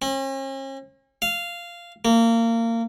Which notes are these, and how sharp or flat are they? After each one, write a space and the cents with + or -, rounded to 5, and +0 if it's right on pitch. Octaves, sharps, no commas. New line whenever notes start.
C#4 -45
F5 -10
A#3 -25